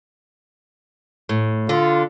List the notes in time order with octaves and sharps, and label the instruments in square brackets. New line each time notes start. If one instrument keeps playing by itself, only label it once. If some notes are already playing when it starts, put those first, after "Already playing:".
[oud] A2
[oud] D3 [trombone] F4